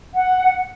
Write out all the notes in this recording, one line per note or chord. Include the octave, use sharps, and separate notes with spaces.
F#5